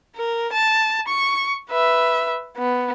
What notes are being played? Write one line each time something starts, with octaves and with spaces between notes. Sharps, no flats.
A#4
A5
C#6
B4 E5
B3